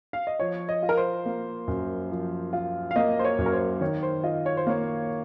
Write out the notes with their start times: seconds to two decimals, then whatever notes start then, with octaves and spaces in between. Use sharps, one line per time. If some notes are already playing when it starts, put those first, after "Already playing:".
0.13 F5
0.27 D#5
0.39 F3 C#5
0.69 D#5
0.83 F4
0.89 A#4
0.97 C5
1.26 A#3
1.68 F#2
2.11 F3
2.53 F4
2.91 F5
2.96 A#3 D#5
3.19 C5
3.25 C#5
3.38 F#2
3.46 A#4
3.53 C5
3.81 D#3 C#5
4.03 C5
4.23 F4 D#5
4.46 C#5
4.57 C5
4.67 A#3 C#5